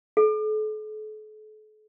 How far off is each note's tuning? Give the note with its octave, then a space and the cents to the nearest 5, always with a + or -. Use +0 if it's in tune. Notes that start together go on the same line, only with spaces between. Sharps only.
A4 -40